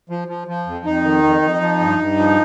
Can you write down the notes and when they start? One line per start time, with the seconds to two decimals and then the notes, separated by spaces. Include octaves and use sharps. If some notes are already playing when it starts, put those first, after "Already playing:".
0.10 F3
0.28 F3
0.48 F3
0.67 F2
0.85 F2 D#4
1.04 D#3
1.23 F2
1.42 F2
1.61 F3
1.80 G2
1.99 G2
2.18 F3